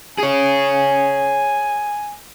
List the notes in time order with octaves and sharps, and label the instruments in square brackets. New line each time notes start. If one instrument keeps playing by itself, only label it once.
[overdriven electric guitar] G#4 C#5 [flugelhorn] G#5